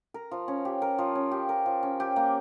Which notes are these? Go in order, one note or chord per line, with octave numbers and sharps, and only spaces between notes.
A#4
F3
C#4
G4
A#4
F3
C#4
G4
A#4
F3
C#4
G4
A#3